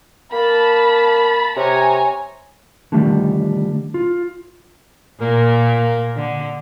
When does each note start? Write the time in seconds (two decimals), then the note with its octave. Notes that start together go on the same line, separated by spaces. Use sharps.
0.33 A#3 A5 B5
1.56 C3 C#5 G#5 A#5
2.92 D3 D#3 F3 G3 A3
3.94 F4
5.21 A#2 A#3
6.16 D3